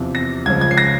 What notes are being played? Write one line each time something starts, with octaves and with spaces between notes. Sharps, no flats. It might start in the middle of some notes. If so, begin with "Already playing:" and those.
Already playing: E2 C3 F3 C4
A#6
C#2 C#3 F3 G#6
G#6
C7
A#6